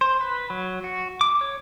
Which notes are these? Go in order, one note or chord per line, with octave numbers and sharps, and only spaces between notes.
C5
B4
F#3
F#4
D6
C#5